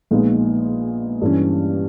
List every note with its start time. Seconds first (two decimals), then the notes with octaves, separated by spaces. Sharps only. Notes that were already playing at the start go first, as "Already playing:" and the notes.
0.11 A#1 A#2 G#3 B3 D#4
1.21 G2 E3 G3 C#4